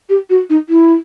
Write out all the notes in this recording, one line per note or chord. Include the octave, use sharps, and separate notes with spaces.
G4
F#4
D#4
E4